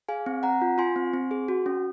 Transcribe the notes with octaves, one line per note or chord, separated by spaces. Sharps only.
G#4 F5 G#5
C4
C4 F#5 A#5
F4
F4 G#5 C6
C4
C4
G#4
F#4
C#4